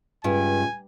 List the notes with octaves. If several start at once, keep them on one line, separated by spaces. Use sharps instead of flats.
C#2 G2 G#5